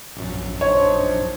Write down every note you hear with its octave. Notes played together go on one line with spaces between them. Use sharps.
A#1 F#2
D4 D#4 C5 C#5